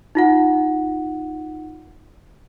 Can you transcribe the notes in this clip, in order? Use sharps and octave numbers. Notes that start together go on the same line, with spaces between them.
D#4 F4 F#5